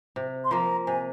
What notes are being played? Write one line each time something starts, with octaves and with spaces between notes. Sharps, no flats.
C3
C6
F3 A#3 A#5
C3 G#5